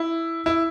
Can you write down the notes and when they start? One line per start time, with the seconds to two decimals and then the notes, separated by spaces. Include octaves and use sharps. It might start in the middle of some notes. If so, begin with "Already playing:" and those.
Already playing: E4
0.46 E4